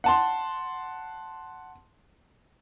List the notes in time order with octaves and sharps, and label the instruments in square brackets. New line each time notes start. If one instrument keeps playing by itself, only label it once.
[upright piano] F#5 A5 C6